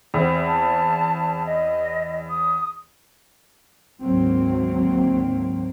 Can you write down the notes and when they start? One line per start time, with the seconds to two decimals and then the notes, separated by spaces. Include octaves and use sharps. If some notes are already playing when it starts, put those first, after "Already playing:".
0.14 E2 C4
0.45 A5
1.45 D#5
2.29 D#6
4.01 G#1 D2 F#3 A#3 C4